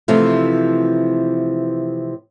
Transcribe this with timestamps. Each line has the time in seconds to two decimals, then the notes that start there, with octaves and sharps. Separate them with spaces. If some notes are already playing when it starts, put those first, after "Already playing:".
0.08 C3 E3 F3 A3